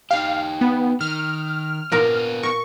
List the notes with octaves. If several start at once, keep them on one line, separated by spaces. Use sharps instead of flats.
D#4 G4 F5
B3
D#3 F6
A#2 B3 F4 A#4 A#5
A#4 C#6